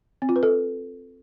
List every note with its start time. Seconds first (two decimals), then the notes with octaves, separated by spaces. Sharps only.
0.22 C4
0.29 F4
0.36 B4
0.43 A4